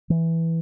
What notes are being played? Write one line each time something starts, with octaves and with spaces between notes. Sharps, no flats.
E3